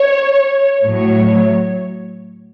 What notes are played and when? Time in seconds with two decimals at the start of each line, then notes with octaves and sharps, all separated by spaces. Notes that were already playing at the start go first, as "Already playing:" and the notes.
Already playing: C#5
0.85 A2 F#3 C#5